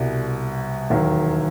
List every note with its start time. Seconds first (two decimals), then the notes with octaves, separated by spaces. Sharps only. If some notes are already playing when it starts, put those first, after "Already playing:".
Already playing: C2 B2 G3
0.90 E1 D#2 D#3 F#3